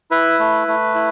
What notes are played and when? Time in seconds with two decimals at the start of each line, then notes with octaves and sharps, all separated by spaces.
0.11 E4 B4
0.39 A3
0.68 A3
0.95 E4